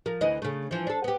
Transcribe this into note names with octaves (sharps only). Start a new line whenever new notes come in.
F3 A#4
D2 E3 D#5
C#3 A3
E3 F3
D4 A4
B3 G4